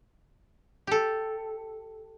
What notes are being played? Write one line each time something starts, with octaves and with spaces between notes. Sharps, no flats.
G4 A4